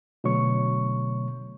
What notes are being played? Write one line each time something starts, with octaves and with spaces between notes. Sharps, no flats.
B2 D3 F#3 A3 C#5 C#6